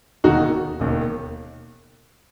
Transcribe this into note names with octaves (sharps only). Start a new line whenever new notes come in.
E1 D#2 D#3 D#4 F#4
E1 D#2 D#3